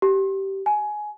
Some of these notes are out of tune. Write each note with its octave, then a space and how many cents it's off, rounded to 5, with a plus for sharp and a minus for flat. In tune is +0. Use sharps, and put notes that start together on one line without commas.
G4 -15
G#5 +15